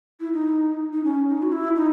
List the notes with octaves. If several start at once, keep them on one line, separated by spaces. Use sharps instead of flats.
E4
D#4
D#4
C#4
D#4
F#4
E4
D#4